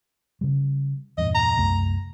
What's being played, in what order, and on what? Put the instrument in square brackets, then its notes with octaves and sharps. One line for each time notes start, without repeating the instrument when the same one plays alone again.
[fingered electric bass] C#3 G3
[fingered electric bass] E2 G2 A#2 [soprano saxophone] D#5
[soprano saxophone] A#5
[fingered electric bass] C2 F#2 A3